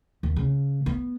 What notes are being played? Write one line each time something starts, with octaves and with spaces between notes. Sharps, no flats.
D#2
C#3
B3